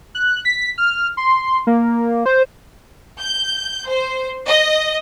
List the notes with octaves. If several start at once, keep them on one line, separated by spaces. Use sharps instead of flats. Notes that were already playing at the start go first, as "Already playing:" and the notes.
F#6
B6
F6
C6
A#3
C5
G6
C5
D#5